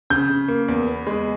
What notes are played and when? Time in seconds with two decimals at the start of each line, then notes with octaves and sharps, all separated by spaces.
0.10 C#3 G6
0.29 C#3
0.48 A#3
0.68 E2
0.87 B3
1.07 G#3